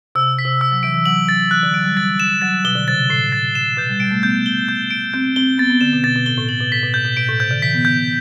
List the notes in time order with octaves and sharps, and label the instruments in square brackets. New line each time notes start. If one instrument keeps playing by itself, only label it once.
[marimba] C3 [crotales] E6
[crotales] B6
[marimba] C3
[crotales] E6
[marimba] F#3
[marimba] E3 [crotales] D7
[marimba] E3
[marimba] F#3 [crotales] F#7
[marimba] F#3 [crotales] A6
[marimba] E3 [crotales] F#6
[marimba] D3
[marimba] F#3 [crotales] D7
[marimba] G3
[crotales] A6
E7
[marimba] F#3 [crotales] A6
[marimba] B2 [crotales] G7
[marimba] D3
[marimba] C3 [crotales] A6
[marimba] A2 [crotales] C7
[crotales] A6
E7
[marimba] B2 [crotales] G6
[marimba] G3
[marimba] G3 [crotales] D7
[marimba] A3
[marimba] B3 [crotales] G6
[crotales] G7
G6
D7
[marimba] C4 [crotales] G6
[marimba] C4 [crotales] G7
[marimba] B3 [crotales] A6
[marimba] B3
[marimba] D3 [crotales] E7
[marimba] B2
[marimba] B2 [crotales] A6
[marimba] B2
[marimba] A2 [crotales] G7
[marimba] A2
[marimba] A2 [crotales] F#7
[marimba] B2
[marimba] A2 [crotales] B6
[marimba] B2
[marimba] A2 [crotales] G6
[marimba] B2
[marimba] B2 [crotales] D7
[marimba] A2
[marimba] C3 [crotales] G6
[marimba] D3
[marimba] E3 [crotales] B6
[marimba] B3
[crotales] G6